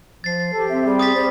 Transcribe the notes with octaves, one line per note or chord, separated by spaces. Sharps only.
F3 A6 C7
G4 A4
C4 E5
G3 G#4
D#6 A6 B6
C4 C5